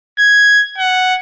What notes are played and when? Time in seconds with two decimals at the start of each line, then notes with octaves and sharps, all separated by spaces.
0.19 G#6
0.78 F#5